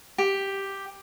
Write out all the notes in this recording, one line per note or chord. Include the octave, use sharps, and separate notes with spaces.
G4